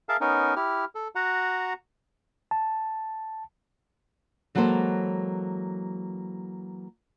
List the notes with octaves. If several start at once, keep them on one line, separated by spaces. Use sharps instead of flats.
G#4 A#4 E5 F5 A5
B3 C#4 D#4 A#4
E4 G4 F6
A4
F#4 F#5 A#5
A5
E3 F#3 G#3 A#3 A4 C5